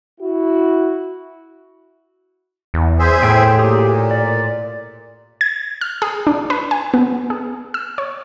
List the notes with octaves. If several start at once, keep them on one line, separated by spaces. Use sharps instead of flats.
E4 F#4
E2
G#4 C5 E5
A2 G5
A#2 G4 G#4 D#6
D5
G#6
F6
G#4
D4
B4
G#5
B3
G#4
E6
C#5